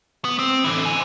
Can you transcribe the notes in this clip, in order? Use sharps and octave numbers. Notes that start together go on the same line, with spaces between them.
B3
C4
D3 E3
C5 G#5